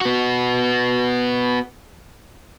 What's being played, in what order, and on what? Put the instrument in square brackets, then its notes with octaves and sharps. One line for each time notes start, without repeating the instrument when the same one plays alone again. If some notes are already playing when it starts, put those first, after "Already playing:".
[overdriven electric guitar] B3 F#4